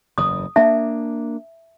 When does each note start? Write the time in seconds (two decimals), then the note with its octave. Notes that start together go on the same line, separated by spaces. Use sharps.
0.18 F#1 E2 D#6
0.56 A#3 D4 E5 A5